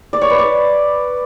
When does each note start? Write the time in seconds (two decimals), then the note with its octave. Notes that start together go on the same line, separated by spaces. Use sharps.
0.13 D5
0.21 C#5
0.30 B4
0.39 D5